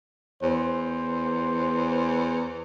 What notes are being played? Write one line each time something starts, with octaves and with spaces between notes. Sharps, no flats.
E2 C5